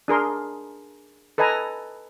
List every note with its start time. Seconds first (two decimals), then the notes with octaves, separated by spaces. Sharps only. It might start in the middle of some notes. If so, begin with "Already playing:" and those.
0.08 D4 G#4 A#4 C6
1.38 A4 B4 D#5 G#5 A#5